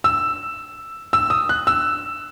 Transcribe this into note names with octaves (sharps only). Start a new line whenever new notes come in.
E6
E6
D#6
F#6
E6